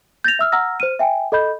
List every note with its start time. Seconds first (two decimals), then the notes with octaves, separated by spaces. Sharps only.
0.24 G6 A6 A#6 F7
0.39 E5 E6 F6
0.52 F#5 A#5 E6 F6 A#6
0.80 C5 F6 D#7
0.99 E5 G5 G#5
1.32 A4 D#5 B5 G6